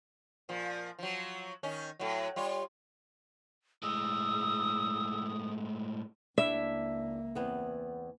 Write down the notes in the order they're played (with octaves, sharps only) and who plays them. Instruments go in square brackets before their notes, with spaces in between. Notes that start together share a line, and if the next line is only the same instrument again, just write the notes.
[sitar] A#2 F3
F3 F#3
D#3 C#4
A2 F#3
G3 F4 C#5
[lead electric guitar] A2 G#3 [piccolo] D#6 [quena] E6
[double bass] C#2 A#3 [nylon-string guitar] D4 E4 [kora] E5
[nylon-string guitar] E2 B3 C4